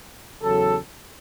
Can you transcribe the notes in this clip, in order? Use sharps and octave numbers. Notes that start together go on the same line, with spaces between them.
E2 C#3 F#3 A4